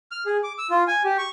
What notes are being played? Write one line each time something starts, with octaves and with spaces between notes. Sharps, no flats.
F6
G#4
D6
E6
F4
G#5
G4
C#6